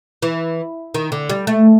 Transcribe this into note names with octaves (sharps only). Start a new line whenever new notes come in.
E3
D#3
D3
G3
A3